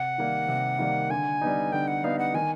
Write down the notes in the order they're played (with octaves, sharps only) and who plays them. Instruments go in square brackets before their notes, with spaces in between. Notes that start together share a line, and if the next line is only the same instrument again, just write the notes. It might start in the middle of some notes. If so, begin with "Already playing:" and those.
Already playing: [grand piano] C3 [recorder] F#5
[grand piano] D#3 G3 A#3
C3
D#3 G3 A#3
[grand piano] D3 [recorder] G#5
[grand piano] G3 B3 D#4
[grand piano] D3 [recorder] G5
[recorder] F#5
[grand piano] G3 B3 D#4 [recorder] F5
[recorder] F#5
[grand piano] D#3 [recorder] G#5